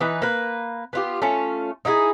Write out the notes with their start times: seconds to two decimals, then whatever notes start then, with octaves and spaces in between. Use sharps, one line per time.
0.01 E3 D#4 B4
0.22 A#3 B4
0.93 B3 F4 G4
1.22 A3 C#4 F4
1.85 D#4 E4 F#4 G#4